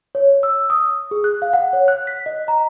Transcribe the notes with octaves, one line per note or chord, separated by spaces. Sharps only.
C#5
E6
D#6
G#4
F#6
F5
F#5
C#5
F#6
B6
D#5
A#5